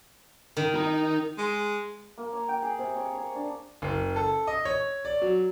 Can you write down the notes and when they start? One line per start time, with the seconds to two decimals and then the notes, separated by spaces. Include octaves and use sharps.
0.57 D#3
0.74 D#4 A#5
1.38 G#3
2.18 A#3
2.33 C#5
2.48 G5
2.62 G#4
2.78 C3
2.96 C#5
3.15 C#5
3.35 D4
3.82 F#1
4.16 A4
4.47 D#5
4.65 C#5
5.05 D5
5.22 F#3